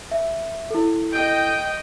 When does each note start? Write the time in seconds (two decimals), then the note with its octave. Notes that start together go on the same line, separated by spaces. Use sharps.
0.11 E5
0.70 E4 A4
1.10 D#5 G5